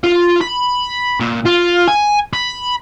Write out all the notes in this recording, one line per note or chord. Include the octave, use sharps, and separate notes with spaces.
F4
B5
A#2
F4
G#5
B5